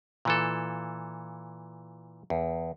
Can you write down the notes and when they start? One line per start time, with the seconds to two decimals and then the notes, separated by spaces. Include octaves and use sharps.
0.25 A#2 E3 A4
2.30 E2